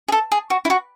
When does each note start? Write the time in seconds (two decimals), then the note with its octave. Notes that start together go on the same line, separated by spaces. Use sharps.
0.08 G#4
0.12 A4
0.32 G#4
0.50 F#4
0.65 E4
0.70 F#4